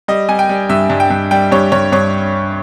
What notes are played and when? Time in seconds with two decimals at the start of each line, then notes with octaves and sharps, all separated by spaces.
0.08 G3 D#5
0.29 G3 G#5
0.39 G5
0.49 G3
0.69 G2 E5
0.90 G2
1.00 G5
1.10 G2
1.31 G3 G5
1.52 G2 C#5
1.72 G2 C#5
1.92 G2 C#5